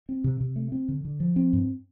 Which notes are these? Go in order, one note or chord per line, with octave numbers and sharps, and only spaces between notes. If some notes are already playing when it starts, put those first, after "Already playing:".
C4
C3
C3
A3
C4
D3
D3
F3
C4
G2